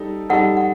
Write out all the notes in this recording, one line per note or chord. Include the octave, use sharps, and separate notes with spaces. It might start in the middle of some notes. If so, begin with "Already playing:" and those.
Already playing: G3 D#4 A4
G3 D#4 A4 F#5
F#5